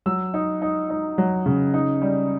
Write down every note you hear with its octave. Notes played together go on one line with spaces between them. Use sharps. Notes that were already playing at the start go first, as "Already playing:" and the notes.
F#3 E6
D#4
D#4
D#4
F#3
C#3
D#4
G3